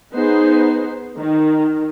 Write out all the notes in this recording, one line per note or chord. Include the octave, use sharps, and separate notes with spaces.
B3 D#4 G#4 B4 C5
D#3